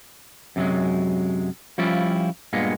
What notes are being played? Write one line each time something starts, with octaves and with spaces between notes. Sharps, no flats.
F#2 C3 E3 F#3 G#3
F3 G3 C#4 E4 F4 G4
G2 A#2 G#3 A#3 B3